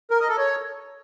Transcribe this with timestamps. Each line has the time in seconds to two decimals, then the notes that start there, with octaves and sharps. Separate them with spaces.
0.11 A#4
0.20 D#5
0.29 A4
0.38 C#5